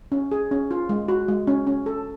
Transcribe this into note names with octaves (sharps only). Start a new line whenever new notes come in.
C#4
G#4
C#4
F4
G#3
F#4
G#3
C#4
C#4
A4